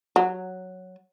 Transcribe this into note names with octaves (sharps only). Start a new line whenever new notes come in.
F#3